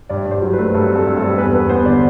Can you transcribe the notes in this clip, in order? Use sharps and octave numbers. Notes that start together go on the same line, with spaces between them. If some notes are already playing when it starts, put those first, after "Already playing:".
G2 D5
G2
C5
F#3
B4
A3
G2 A4
C4
A4
G2
A4
G2
E2 B4
B3 B4
B3 C5
D3 D5